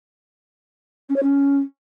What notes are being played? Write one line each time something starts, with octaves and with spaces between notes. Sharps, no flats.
C#4
C#5
C#4